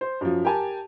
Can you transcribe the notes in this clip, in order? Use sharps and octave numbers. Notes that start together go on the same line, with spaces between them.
C5
F#2 F3
G4 A#4 G#5 A5